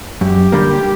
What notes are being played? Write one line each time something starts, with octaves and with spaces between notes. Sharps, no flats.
F#2 G4
D3 G3 A#3